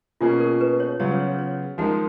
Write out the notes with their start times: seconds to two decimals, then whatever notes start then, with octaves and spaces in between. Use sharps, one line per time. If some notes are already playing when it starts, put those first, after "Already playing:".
0.21 B2 A#3 C#4 F4 G#4
0.40 A#4
0.61 B4
0.80 C#5
1.00 C#3 F#3 B3 F4 C#5
1.19 C#5
1.39 C#5
1.78 F3 G#3 D#4 A#4 F#5